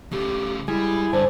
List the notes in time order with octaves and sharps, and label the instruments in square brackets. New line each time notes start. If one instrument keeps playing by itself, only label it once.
[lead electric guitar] C#3 A3 [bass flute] G4
[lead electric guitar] G3 [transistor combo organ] G#3 G#4 [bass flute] E4
[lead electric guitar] G2 [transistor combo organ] D3 A4 G#5 [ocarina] C5